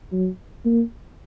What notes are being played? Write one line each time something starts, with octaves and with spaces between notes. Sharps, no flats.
F#3
A#3